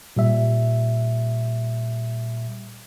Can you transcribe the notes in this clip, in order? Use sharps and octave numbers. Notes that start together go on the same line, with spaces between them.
A#2 G3 E5